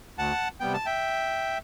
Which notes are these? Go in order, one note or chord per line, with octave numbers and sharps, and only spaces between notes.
D2 F#5 A5
C3 G3 B3 G5
A5
E5 G5